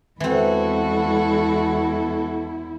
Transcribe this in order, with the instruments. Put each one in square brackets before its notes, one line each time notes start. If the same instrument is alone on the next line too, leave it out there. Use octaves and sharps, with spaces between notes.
[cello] E2 E4 [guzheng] E3 C4 [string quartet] G#3 F#4 A4